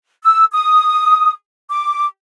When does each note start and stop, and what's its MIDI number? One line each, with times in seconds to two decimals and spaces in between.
0.23 0.44 88
0.52 1.31 87
1.70 2.04 86